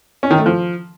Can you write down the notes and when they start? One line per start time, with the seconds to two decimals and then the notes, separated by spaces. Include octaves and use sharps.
0.23 C#4
0.31 D#3
0.38 A3
0.46 F3